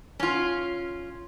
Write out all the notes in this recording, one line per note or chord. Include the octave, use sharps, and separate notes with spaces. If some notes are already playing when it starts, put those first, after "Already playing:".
C#4 F4